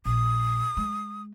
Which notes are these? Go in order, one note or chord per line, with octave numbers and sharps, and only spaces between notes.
A#1 D#6
G#3